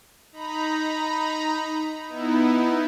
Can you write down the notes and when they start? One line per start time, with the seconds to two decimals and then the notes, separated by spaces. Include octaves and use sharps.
0.32 D#4 A#5 B5
2.08 B3 D#4 E4